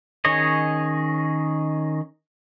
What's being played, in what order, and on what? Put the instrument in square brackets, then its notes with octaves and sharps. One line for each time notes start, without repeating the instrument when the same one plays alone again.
[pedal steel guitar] D#3 C#4 G#4 C#5 D#5